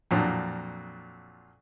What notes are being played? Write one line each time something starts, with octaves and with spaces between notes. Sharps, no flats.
F2 A#2 F#3 D4